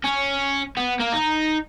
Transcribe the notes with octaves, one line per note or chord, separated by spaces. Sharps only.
C#4
B3
A#3
D#4